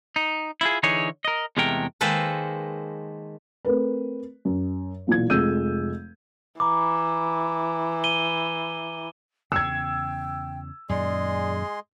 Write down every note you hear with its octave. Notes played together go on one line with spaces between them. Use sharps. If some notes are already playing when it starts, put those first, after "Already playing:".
D#4
E4 F4 G#4
D3 E3 D#4 G#4 C#5
A#4 D#5
E2 C3 G#3 A3 A#4 G5
D#3 G#3 A#3 A4 B4 C5
A3 C4 A#4 B4
F#2
B1 A#2 E3 G#6
F1 F2 G#3 E6 G6 D#7
E3 A#5 B5 D6
D#7 G7
E2 C#3 G5 E6 G#6
F#2 A#2 D#3 G#3 G#4 D5 C6